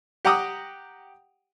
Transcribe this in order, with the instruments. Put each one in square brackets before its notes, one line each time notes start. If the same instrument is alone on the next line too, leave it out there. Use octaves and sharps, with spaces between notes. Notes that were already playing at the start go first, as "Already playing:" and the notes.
[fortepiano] G4 F#5 G5 A#5 D6 D#6